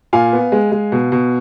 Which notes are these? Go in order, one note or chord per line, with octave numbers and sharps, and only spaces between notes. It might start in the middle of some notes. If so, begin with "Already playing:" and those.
A#2 F5 G#5
B3
G#3
G#3
B2
B2